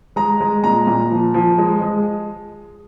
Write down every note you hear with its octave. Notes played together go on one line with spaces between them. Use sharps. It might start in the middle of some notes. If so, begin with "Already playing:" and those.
G#3 A#5
G#3
A#2 A#5
A#2
F3
F3
G#3
G#3